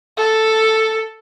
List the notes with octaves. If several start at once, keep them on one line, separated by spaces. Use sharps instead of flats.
A4